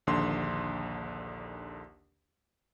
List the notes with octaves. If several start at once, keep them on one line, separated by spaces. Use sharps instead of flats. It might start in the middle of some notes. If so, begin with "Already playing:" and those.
A#1 D#2 D3 C6